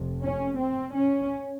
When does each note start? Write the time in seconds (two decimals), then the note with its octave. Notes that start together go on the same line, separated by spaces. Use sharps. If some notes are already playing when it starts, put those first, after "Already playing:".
Already playing: F1 F2 C3
0.21 C#4
0.57 C4
0.94 C#4